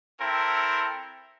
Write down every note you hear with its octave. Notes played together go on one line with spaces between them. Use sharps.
C4 E4 A4 A#4